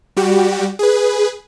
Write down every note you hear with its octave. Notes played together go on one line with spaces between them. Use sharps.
G3 F#4 G4
G#4 B4